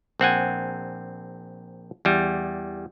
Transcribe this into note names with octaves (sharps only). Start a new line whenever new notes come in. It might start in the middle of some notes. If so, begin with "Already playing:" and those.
A#1 C4 F#5 G#5
E2 G3